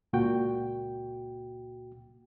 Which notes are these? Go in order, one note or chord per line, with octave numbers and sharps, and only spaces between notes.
C#2 A#2 F#4 G5